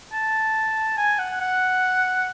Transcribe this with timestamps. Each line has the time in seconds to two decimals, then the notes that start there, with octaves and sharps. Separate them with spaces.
0.12 A5
0.97 G#5
1.19 F#5
1.40 F#5